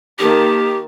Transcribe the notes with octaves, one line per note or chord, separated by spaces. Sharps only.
D#3 A#3 G4 A5